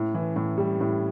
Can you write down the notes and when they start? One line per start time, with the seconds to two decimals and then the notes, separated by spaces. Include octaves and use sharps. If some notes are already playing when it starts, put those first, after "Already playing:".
Already playing: A2
0.14 E3
0.36 A2
0.58 G3
0.81 A2